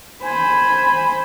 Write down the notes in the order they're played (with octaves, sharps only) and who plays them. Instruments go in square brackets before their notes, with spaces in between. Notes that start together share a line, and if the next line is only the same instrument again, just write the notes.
[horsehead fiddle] C5 B5 [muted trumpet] G#5